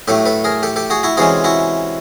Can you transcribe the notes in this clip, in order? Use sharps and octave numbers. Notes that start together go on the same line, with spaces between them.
A2 F#3 A3 G4 A4
A4 B4
G#4 A#4
G4 A4
G4 A4
F#4 G#4
E4 F#4
C3 E3 G#3 C#4 F#4 G#4
E4 F#4